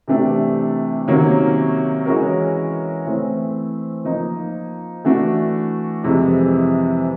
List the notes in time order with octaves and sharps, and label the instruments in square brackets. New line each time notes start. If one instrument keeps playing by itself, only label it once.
[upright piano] C3 E3 A3 D4 G4
C3 D#3 F#3 A#3 C#4
E3 G#3 C#4 F#4 A#4
E3 A3 C4
F3 A#3 D#4
E3 A3 D4 F#4
F2 C3 E3 G#3